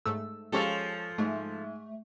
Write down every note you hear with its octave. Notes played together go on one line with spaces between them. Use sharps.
G#2 A3 E6
F3 G#3 C#4 G4 A4 C#5 F5
G#2 G#3 A3